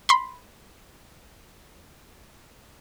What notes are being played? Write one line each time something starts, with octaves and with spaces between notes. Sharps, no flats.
B5 C6